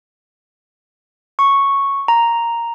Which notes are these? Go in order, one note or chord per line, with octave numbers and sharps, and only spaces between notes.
C#6
A#5